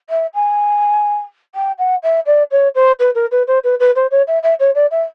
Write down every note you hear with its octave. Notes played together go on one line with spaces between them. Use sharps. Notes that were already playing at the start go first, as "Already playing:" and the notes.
E5
G#5
G5
F#5
E5
D5
C#5
C5
B4
A#4
B4
C5
B4
B4
C5
C#5
E5
E5
C#5
D5
E5